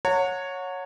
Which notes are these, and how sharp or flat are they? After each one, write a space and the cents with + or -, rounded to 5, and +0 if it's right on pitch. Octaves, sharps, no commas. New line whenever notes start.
C#5 +0 F#5 -25 A#5 -40